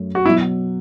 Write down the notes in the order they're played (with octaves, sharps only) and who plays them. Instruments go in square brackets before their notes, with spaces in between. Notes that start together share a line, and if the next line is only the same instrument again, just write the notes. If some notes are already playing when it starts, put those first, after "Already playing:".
Already playing: [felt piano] F#2 A3
[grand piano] F#4
[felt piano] B2 F#3 [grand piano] E4